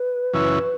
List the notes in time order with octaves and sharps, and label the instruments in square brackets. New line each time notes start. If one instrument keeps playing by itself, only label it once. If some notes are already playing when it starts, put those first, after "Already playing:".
Already playing: [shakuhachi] B4
[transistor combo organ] F#2 C#3 E3 C#4 E4